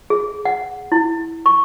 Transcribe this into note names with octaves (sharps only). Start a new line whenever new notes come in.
G#4
F#5
E4
C#6